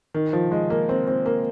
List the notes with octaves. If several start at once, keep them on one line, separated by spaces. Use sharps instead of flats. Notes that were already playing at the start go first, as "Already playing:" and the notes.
D#3
F3
G#3
A#3
C4
C4
A#3